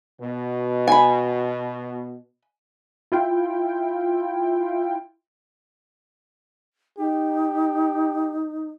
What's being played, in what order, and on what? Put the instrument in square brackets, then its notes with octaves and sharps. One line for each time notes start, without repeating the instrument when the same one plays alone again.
[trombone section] B2
[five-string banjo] G#5 B5
[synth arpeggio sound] E4 F4 G5
[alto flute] D#4 [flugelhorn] G4